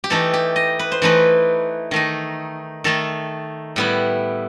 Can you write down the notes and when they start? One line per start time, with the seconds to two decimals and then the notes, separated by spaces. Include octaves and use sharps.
0.04 G4
0.10 E3 A3 D#4 A4
0.34 G4
0.56 D#5
0.79 B4
0.92 C5
1.02 E3 A3 D#4 B4
1.91 D#3 A3 D#4
2.84 D#3 A3 D#4 A4
3.76 A2 G3 B3 E4